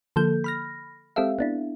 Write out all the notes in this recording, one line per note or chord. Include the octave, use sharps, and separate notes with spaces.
D3 F3 A#3 A4 G6
B5 F6 A#6
G#3 C4 G4 A4 E5 F5
B3 D4 E4